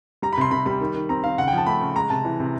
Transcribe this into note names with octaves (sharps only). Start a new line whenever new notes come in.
G3 A#5
B5
C3 C6
C3 B5
G3 B5
D#3
D#3
C4 A#5
D#3 F5
C#3 F#5
G5
F3 A5
A3 B5
C#3
G#3 A#5
C3 A5
E3
C3